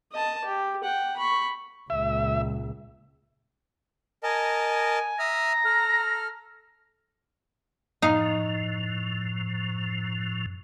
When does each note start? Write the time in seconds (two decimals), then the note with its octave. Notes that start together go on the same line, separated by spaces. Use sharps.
0.12 D#5 A5
0.45 G4
0.84 F#5 G5
1.17 B5 C#6
1.90 C#2 A#2 E5
4.23 A#4 D#5 G#5 A5
5.19 E5 A#5 D#6 F6
5.65 A4 F6
8.02 F#2 A2 F3 D#4 F5